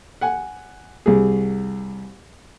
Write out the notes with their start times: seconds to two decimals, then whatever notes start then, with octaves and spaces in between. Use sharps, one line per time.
0.21 F#5 G#5
1.06 C2 G#4